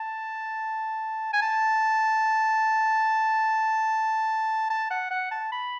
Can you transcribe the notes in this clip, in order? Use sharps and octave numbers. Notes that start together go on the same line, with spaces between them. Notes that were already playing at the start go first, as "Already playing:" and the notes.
Already playing: A5
G#5
A5
A5
F#5
F#5
A5
B5